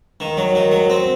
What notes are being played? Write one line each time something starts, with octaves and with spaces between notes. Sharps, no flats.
D#3
F#3
D#3
F#3
C4